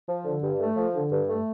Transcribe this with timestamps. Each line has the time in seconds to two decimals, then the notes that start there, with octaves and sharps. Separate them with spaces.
0.08 F3
0.25 D3
0.42 G2
0.59 A3
0.76 F3
0.94 D3
1.11 G2
1.28 A3